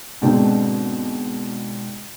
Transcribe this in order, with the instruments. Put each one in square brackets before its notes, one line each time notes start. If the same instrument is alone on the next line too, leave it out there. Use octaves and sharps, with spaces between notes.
[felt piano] G#2 B2 D3 C4 D#4 G#4